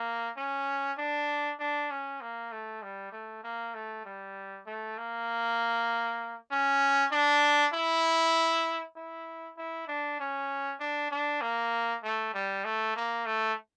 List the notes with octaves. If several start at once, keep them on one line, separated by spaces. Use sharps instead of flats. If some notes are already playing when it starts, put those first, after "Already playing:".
Already playing: A#3
C#4
D4
D4
C#4
A#3
A3
G3
A3
A#3
A3
G3
A3
A#3
C#4
D4
E4
E4
E4
D4
C#4
D4
D4
A#3
A3
G3
A3
A#3
A3